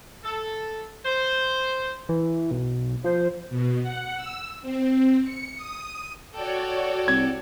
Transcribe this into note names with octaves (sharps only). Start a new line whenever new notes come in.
A4
C5
E3
B1
F3 C5
B2
F#5
E6
C4
C#7
D#6
F#4 A4 C#5 D5 G5
C2 G#6